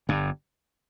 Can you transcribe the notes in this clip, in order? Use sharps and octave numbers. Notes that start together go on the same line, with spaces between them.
G1 G2